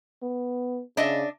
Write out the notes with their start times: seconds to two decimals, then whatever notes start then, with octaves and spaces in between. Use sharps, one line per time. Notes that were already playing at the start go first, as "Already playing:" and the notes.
0.22 B3
0.97 C#3 D4 D#5 E5